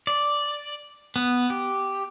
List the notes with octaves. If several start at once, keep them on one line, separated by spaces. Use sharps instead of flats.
D5
B3
G4